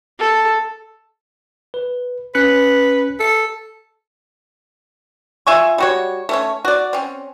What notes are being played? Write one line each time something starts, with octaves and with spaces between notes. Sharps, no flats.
A4
B4
C#4 B4 F#6 C#7
A4
F4 E5 G#5 C#6
G3 F#4 C#5
A3 C#4 C#5
F#4 D5
C4 C#4